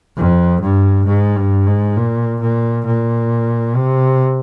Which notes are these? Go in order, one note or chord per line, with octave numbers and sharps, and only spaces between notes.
F2
G2
G#2
G2
G#2
A#2
A#2
A#2
C3